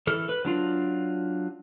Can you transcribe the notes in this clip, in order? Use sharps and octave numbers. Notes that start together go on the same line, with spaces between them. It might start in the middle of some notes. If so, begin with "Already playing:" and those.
E3 A4 F6
B4
F#3 D4 F4